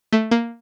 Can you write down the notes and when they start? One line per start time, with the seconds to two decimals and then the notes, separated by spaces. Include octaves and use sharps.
0.13 A3
0.31 A#3